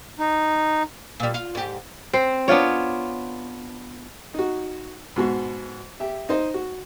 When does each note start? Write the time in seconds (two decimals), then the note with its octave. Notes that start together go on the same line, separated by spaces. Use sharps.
0.19 D#4
1.20 A#2 G3
1.34 F4
1.55 G#2 G4
2.13 C4 C5
2.48 B3 D4 F4 C#5
4.34 D#4 F#4
5.16 G#2 B2 F#4
6.00 G4 E5
6.29 D#4 C5 D#5
6.54 F#4